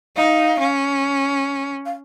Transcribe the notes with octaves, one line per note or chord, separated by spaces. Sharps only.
D#4 F5
C#4
F5